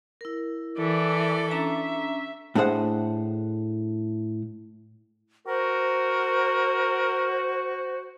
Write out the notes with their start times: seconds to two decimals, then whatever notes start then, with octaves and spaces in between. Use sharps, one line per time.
0.21 E4 A#4
0.79 E3 A4 D5
1.51 C#4 D4 E5 A#5
2.55 A2 A3 D4 G#4 C5 F#5
5.48 F#4 A#4 C5